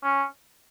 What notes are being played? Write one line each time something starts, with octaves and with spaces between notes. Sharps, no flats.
C#4